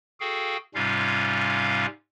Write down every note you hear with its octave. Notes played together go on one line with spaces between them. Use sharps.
F#4 G#4 A4 F5 G5
G#2 C3 G3 C#4 F4 F5